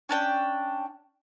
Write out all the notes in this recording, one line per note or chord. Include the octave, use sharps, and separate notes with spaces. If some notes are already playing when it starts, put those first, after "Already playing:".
C#4 D4 G5